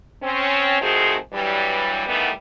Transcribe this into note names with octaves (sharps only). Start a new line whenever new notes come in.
C4 C#4
D#3 F3 A3 C4 F#4 G#4
G2 E3 F#3 G3
D#3 E3 G3 A3 B3